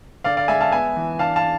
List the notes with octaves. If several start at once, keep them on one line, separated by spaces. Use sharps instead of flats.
D3 D5 F5
D5 F5
G#3 E5 G#5
F5 A5
B3 E5 G#5
E3
D4 F5 A5
F5 A5